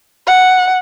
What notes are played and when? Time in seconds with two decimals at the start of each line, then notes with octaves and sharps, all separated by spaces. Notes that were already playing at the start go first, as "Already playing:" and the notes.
0.27 F#5